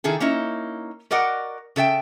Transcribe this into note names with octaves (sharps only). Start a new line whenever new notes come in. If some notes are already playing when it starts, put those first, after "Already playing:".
D#3 E4 G#4 A4
A#3 C#4 D#4 E4
F#4 A#4 D5 D#5 F#5
C#3 A4 E5 G5